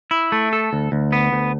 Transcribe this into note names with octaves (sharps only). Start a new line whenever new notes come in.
E4
A3
A4
D2
D2
B3
D2